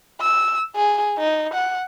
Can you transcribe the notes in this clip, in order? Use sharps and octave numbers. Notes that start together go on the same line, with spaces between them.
E6
G#4
D#4
F#5